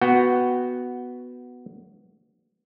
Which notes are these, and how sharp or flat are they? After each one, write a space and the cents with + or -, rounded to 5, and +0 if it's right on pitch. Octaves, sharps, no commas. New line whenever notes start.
B3 +0 F#4 +0 G5 +0